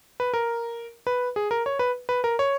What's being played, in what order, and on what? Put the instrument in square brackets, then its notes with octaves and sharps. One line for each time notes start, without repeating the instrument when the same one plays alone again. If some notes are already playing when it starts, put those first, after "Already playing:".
[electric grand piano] B4
A#4
B4
G#4
A#4
C#5
B4
B4
A#4
C#5